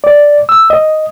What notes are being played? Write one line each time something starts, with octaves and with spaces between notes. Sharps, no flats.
D5
E6
D#5